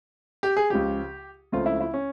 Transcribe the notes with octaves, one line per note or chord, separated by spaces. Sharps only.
G4
G#4
C#2 C#3 F3 G4
C#2 C#3 F3 A3 C4 F4
E4
E4
C#4